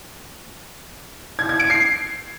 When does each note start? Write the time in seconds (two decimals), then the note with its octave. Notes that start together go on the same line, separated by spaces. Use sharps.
1.39 G#6
1.49 G#6
1.60 D7
1.70 C7